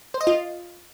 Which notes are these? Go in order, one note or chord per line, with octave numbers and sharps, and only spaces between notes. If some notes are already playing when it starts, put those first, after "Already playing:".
C5
D#5
F4